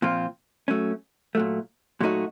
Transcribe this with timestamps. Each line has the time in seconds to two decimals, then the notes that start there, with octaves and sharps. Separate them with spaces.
0.02 A#2 F3 C4 F4
0.68 F#3 A3 C#4
1.35 A#2 F#3 A3
2.01 A#2 F#3 A3 D#4 F#4